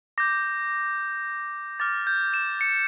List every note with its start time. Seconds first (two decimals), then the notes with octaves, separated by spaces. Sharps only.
0.18 D6 G6 A#6
1.80 D6 F6 A6
2.07 G6
2.34 E7
2.61 C#7